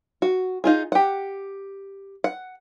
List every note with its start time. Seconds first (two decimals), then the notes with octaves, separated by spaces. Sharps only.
0.22 F#4
0.64 D#4 F4 G#4
0.92 G4 F#5
2.24 F#5